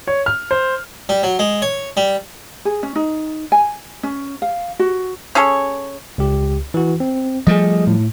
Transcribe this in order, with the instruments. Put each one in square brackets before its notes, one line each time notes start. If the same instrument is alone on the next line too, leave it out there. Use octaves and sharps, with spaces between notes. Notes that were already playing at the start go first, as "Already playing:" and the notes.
[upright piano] C#5
F6
C5
[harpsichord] G3
F#3
G#3
C#5
G3
[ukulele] G#4
C#4
D#4
G#5
C#4
F5
F#4
[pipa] C#4 G#4 A4 C#5
[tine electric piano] C#2 G4
E3 F#4
C4
[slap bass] F3 G3 A3 [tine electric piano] G#4 D#5
[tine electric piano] A2